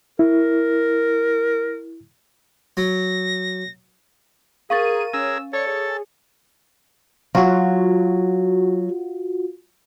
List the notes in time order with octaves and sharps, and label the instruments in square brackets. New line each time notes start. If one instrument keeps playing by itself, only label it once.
[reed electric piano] E4 [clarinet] A#4
[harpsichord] F#3 [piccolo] A#6
[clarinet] G#4 [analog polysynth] A#4 D#7 [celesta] F5 C#6 A6
[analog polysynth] C#4 [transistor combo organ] G#4 A#4 [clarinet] E6
[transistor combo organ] A4 [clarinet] C#5 [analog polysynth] D5 C#7
[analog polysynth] G#4 [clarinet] C#5
[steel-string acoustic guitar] F#3 [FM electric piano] F4 F#4